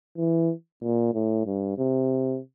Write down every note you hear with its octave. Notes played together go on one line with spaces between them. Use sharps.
E3
A#2
A2
G2
C3